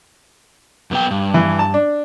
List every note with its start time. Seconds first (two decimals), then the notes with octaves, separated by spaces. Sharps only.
0.91 F#2 B3 G5
1.11 G2
1.34 E3
1.59 A5
1.74 D4